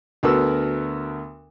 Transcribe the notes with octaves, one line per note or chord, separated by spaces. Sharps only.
D2 B3 F#4 A4 A#4 E6